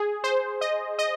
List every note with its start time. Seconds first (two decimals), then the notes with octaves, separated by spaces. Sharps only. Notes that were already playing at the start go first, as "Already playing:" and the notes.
Already playing: G#4
0.24 C5
0.61 D#5
0.99 D#5